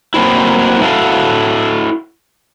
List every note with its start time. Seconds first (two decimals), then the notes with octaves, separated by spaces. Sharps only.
0.14 F#3 A#3 C4 E4
0.81 E4 F#4 A4 F5